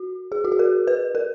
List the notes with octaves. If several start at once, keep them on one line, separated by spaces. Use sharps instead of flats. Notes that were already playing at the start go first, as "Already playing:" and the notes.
Already playing: F#4
G#4
F#4
G#4
A#4
B4
A#4